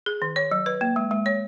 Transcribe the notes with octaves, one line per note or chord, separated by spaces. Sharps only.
G#4
D#3
C#5
F#3
B4
A#3
G#3
G#3
C#5